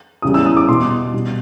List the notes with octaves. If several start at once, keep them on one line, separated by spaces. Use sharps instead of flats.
E2 C#3 E3 G3 D#6
E6
D#6
D6
B2 G3 C6
B2 G3